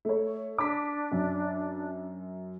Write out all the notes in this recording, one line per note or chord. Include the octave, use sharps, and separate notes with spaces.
A3 C#5
D4 D6 B6
F#2